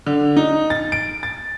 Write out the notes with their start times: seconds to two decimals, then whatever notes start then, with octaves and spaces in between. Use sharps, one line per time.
0.06 D3
0.37 D#4
0.70 A6
0.92 D7
1.23 A6